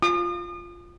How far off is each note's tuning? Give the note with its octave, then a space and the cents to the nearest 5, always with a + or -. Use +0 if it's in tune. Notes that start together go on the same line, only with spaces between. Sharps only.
F4 +0 D#6 -40